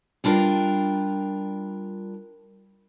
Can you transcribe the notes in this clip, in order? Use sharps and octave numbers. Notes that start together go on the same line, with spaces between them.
G3 D4 F4 A#4 G5